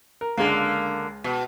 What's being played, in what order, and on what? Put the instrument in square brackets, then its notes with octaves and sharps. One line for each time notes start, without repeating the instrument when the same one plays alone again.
[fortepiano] A#4
[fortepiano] C#2 G#3 [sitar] D3 A#3
[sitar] B2